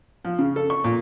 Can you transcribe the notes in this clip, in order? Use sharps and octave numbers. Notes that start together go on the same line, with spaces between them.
F3
C#3
A4
C#6
A#2